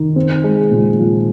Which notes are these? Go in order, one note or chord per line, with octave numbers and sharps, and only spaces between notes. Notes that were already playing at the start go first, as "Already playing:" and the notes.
Already playing: D#3
C4
G#3
A#2
F3